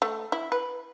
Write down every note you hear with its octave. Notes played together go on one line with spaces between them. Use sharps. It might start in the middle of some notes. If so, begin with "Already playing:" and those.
A3
E4
B4